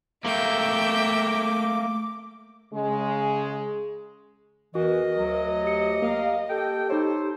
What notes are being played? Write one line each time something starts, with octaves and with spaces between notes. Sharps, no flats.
A3 A#3 E5 G5 D6
C#3 G#3
E2 E3 F#4 A#4 D#5
D2 F#3
G4 D#6 C#7
A#3 A#4 F5
G4 A4 G5
D#4 A4 C5 C#5